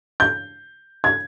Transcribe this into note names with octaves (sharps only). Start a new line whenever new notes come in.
G6
G#6